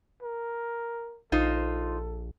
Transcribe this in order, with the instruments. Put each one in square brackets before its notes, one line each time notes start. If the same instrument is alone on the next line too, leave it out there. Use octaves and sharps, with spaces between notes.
[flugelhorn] A#4
[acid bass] A#1 [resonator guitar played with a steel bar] D#4 F4 C5 [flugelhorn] A4